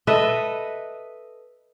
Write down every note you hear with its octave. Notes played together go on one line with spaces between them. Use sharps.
A4 B4 D#5 E5